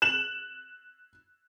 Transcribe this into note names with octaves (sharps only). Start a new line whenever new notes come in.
F#6 E7 F#7